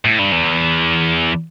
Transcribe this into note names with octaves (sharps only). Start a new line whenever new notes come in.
A2
G2
E2